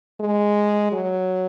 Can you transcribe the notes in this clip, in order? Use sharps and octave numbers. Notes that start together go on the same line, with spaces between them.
G#3
F#3